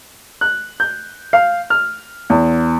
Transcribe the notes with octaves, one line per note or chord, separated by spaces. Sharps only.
F#6
G6
F5
F6
E2